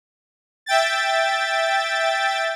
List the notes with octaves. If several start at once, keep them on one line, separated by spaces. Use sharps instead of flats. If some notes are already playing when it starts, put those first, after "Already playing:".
E5 G5 A6